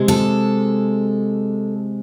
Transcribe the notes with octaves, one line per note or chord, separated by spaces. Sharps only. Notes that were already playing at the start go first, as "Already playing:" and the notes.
Already playing: C3 G#3
A4